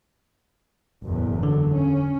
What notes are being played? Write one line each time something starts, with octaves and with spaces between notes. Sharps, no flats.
F#1 E2 A2
D3 F#3
C#4